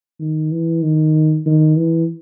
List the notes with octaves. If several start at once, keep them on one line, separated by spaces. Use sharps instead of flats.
D#3
E3
D#3
D#3
E3